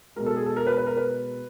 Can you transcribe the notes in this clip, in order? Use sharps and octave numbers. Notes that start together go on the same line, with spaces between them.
B2 G#3 A#4
A4
G#4
A4
A#4
B4
B4
A#4
B4